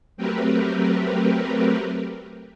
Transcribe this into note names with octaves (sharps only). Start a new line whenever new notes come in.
F#3 A3 C4 G4 A#4 B4